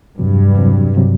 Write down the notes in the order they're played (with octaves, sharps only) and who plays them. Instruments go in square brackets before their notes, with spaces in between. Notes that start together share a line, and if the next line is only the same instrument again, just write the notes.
[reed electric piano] E2 C3 F#3 [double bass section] G2
[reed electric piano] E2 C3 F#3
C3 F#3